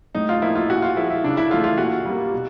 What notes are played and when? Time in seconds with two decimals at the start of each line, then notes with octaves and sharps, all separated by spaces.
0.15 A2 D#4
0.29 F4
0.42 F3 A#3 E4
0.55 F4
0.69 A#2 F#4
0.82 F4
0.97 F3 G#3 E4
1.10 E4
1.24 C#3 D4
1.37 E4
1.51 E3 A3 F4
1.64 F4
1.78 A#2 F#4
2.05 G3 A#3
2.33 B2